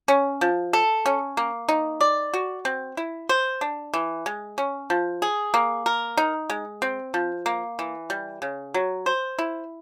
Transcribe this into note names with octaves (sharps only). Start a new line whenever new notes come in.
C#4
F3
A4
C#4
A#3
D#4
D5
F#4
C4
E4
C5
D4
E3
G#3
C#4
F3
G#4
A#3
A#4
D#4
G#3
C4
F3
A#3
E3
G3
C#3
F#3
C5
E4